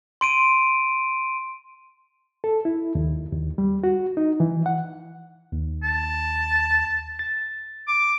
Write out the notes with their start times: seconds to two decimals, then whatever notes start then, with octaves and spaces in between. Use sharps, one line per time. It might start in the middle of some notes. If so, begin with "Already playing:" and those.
0.21 C6 D7 D#7
2.44 A4
2.65 E4
2.95 D#2
3.32 D#2
3.58 G3
3.84 F#4
4.17 D#4
4.40 E3
4.66 F#5
5.52 D#2
5.83 A5
7.19 A6
7.88 D6